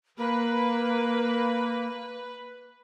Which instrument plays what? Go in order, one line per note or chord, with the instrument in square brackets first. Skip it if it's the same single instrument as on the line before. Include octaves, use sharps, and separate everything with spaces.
[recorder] A#3 [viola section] B4